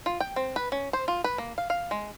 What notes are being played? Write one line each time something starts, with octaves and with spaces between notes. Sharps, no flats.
F4
G5
C4
B4
C#4
C5
F4
B4
A#3
F5
F5
G#3